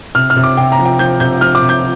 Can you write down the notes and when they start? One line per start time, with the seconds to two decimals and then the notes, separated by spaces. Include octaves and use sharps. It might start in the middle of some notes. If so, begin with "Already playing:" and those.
0.15 C3 F6
0.30 F6
0.36 C3
0.44 D6
0.57 C3 G5
0.72 A#5
0.79 F3
0.85 G5
0.99 F3 G6
1.20 C3 G6
1.41 F3 F6
1.55 D6
1.62 C3
1.69 G6